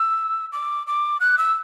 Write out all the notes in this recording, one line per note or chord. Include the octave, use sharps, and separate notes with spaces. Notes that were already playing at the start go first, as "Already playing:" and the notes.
Already playing: E6
D6
D6
F#6
E6